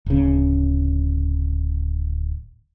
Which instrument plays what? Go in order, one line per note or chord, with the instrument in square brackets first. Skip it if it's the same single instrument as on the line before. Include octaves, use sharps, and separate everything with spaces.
[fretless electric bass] D1 C#3